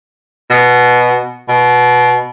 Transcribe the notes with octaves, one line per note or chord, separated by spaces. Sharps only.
B2
B2